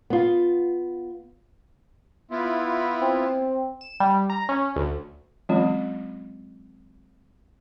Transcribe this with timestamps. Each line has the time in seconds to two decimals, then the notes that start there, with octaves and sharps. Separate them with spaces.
0.10 B3 F4
2.31 B3 E4 F4
3.02 C4
3.81 E7
4.00 G3
4.30 A#5
4.49 C#4
4.76 D2
5.49 E3 F#3 G#3 C4 C#4 F4